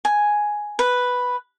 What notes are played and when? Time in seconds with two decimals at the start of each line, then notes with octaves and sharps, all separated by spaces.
0.05 G#5
0.79 B4